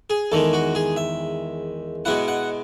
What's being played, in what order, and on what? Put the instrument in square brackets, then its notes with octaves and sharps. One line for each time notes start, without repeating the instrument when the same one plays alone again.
[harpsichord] G#4
E2 D#3 G#3 A4
F#4
G#4
E5
B2 G#3 B3 E4 F#5
F#5